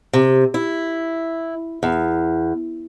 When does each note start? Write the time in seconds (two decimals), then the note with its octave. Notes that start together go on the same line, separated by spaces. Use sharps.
0.13 C3
0.54 E4
1.83 E2